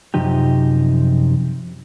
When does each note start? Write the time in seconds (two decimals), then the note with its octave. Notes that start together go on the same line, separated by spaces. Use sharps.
0.14 F#2 C3 F3 D#4 G4